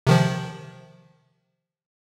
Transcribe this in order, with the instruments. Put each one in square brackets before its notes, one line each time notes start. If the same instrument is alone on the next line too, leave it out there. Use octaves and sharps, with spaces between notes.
[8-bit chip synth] C3 D#3 F3